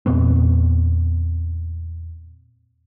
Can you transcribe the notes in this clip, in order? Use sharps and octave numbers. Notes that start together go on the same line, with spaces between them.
E2 A#2 B3 C4